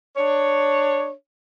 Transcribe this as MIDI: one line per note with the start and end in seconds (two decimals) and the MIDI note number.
0.16 1.10 62
0.16 1.10 73